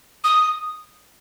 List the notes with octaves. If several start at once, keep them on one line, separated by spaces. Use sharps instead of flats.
D#6